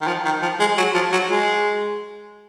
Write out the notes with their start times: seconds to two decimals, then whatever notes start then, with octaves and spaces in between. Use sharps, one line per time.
0.01 D#3
0.07 F3
0.25 D#3
0.42 F3
0.60 G#3
0.77 F#3
0.94 F3
1.12 F#3
1.29 G#3